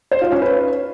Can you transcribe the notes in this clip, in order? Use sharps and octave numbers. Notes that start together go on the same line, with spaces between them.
C5
F4
C#4
B4